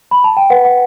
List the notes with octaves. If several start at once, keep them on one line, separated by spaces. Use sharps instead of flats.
B5
A5
G5
B4 F#5
F#5